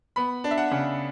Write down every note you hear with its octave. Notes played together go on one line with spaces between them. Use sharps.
B3 B5
D4
E5
F#5
C#3